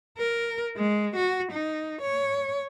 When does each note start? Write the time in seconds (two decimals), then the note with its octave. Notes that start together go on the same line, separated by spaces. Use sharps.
0.18 A#4
0.76 G#3
1.16 F#4
1.52 D#4
2.01 C#5